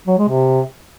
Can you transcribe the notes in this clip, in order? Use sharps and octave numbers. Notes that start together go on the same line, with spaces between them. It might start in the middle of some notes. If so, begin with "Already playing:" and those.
F#3
G#3
C3